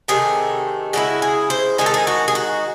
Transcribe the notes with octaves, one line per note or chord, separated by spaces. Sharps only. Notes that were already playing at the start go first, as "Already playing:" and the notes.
C3 D#3 A3 G#4
C#3 G#3 C4 E4 F#4
G#4
C5
D#3 G#3 D#4 G#4
A4
G#4
F#4
G#4
F#4